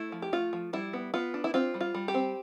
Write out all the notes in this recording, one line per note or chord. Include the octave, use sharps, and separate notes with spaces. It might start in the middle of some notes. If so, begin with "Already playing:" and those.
Already playing: A3 E4
F3
G4
A3 F4
F3
G3 E4
B3
B3 F4
D4
E4
C4 F4
G3
F4
G3
G4
C4